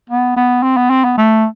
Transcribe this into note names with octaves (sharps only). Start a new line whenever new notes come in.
B3
B3
C4
B3
C4
B3
A3